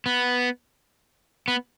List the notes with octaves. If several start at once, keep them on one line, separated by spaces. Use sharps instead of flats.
B3
B3